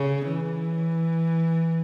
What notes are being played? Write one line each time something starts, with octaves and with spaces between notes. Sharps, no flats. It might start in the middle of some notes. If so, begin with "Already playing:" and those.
Already playing: C#3
E3